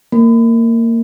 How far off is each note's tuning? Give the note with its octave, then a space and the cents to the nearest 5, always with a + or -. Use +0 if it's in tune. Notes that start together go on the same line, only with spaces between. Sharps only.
A#3 -20